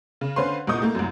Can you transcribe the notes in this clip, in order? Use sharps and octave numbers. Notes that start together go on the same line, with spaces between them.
C#3
D3 C#4 B4 C5 F5 C6
C2 A#2 D#5 C#6 D#6 G6
A3 A#3
C2 F#2